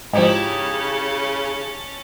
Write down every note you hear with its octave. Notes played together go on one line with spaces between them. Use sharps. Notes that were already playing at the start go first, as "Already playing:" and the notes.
G#2 C#3 F3 C#4 D#4 E4 G4 A5